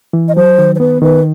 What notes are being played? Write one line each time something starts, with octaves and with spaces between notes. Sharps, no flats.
E3
D#5
F#3 C5
D#3
C5
B3 B4
D#3 B4